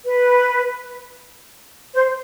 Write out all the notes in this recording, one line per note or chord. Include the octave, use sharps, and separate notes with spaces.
B4
C5